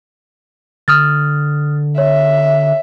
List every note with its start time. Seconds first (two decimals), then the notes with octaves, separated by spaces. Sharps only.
0.88 D3 D#6 F6 A6
1.98 C#5 E5